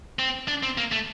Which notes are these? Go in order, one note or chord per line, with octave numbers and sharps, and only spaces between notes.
C4
D4
C4
A#3
A3